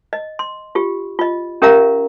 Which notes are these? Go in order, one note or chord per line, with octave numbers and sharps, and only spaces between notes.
D#5
C6
F4 G4
F4 D#5
C#4 G4 A#4 E5 F5 A#5